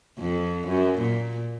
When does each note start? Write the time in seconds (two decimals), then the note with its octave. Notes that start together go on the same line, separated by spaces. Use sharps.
0.19 F2
0.67 F#2
0.98 A#2